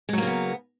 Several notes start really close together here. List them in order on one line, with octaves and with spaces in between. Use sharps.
G#3 F#3 A#3 C#3 B3